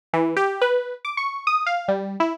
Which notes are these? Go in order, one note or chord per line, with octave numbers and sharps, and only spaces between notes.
E3
G4
B4
D6
C#6
D#6
F5
G3
E4